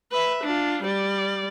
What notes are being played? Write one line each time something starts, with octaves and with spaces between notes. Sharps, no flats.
B4 E5
D4 F4
G3 D5